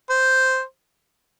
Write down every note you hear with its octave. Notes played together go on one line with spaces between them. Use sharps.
C5